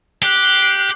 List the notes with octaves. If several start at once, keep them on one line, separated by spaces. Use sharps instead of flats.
G4 F#6 C7